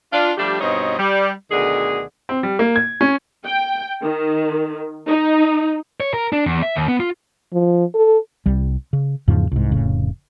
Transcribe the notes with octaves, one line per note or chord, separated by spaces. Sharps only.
D4 F4
F3 G3 A3 D4 G4
G2 B2 C4 D#4 C#5 D#5
G3
D2 B2 D3 D#3 G#4
C4
G3
A#3
G#6
C#4
G5
D#3
D#4
C#5
A#4
D4
E2
E5
D#2
B3
F4
F3
A4
C2 G3
C#3
E2 G#2 C#3 F3
C2 G#2
F1 A2 C#3